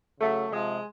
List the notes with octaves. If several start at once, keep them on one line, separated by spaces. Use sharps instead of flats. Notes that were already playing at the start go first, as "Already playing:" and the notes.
C#3 F#3 A3
C3 F3 G#3